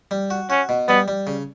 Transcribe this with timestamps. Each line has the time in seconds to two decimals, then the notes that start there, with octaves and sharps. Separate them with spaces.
0.11 G3
0.30 F#4
0.50 C#4 F#4
0.69 B2
0.88 G3 B3
1.08 G3
1.27 C#3